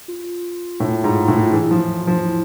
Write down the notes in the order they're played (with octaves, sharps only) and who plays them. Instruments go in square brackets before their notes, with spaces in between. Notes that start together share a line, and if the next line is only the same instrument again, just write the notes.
[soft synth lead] F4
[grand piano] A2
G#2
A2
[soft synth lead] F4
[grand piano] E3 [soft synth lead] G#4
[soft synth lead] E4
[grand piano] F3
[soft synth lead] F4
F4
[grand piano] F3
[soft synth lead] E4